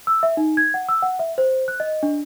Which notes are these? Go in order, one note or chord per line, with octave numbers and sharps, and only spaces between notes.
E6
E5
D#4
G#6
F#5
E6
F#5
E5
C5
F#6
D#5
D4